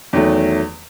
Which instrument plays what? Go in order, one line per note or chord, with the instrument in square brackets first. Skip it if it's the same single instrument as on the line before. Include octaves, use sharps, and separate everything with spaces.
[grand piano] E2 D#3 F#3 A3